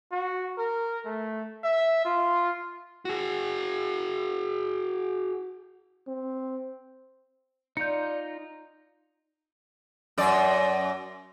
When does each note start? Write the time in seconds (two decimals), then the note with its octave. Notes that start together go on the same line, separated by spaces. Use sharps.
0.12 F#4
0.58 A#4
1.05 A3
1.64 E5
2.05 F4
3.05 F#4 G#4
6.07 C4
7.77 D#4 F4 D5 G6 C#7
10.18 F#2 D5